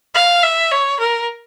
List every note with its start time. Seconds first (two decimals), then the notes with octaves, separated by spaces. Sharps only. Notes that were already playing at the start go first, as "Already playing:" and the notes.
0.15 F5
0.43 E5
0.71 C#5
1.00 A#4